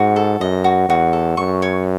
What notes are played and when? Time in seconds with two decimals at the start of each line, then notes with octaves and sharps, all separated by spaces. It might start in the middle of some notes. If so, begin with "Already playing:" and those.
Already playing: G#2 F#4
0.16 A4
0.40 F#2 D#5
0.64 F#4
0.89 E2 F#4
1.13 A4
1.37 F#2 C#6
1.62 C#5